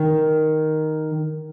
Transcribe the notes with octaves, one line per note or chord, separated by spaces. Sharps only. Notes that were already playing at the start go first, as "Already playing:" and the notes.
Already playing: D#3